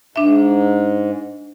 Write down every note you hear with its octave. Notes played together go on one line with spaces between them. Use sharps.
G#2 D4 E5